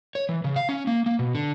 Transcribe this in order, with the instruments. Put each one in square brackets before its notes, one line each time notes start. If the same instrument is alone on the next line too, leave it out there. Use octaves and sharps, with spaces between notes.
[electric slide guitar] C#5
E3
C#3
F5
C#4
A#3
A#3
B2
D3